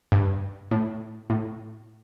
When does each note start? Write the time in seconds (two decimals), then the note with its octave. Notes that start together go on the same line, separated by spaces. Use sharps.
0.12 G2
0.71 A2
1.30 A2